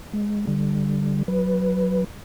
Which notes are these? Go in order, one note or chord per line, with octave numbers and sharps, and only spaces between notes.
G#3
D3 G3
F#3 B4